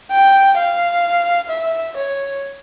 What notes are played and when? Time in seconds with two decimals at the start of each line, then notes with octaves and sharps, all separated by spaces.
0.11 G5
0.57 F5
1.49 E5
1.96 C#5